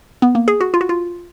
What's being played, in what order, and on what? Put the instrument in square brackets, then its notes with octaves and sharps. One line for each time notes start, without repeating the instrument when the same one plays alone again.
[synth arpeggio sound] B3
A#3
G#4
F#4
F4
F#4
F4